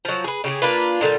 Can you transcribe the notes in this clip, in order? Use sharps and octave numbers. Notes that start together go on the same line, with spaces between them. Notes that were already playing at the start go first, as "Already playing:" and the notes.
F3 F#3
G#4 B4
C#3 G4 G#4
A#3 D4 F4 B4
A#2 D3 D#3 G3